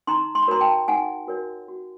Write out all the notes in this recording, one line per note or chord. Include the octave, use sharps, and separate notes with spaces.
D#4 A#5 C6
C6
B5
F#4 A#4 C#5 A#5 C6
G5 A5
D#4 F#5 G#5
F#4 A#4 C#5
F#4